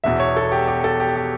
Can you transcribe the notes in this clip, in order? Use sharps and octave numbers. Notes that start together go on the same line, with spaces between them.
E1 E2 B2 E5
C#5
A4
G4
G4
A4
G4
G4